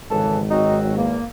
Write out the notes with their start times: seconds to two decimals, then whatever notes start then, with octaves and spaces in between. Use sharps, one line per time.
0.10 G#1 C#3 E3 A4
0.50 F#3 C4 D#4 F#4
0.97 E2 A#3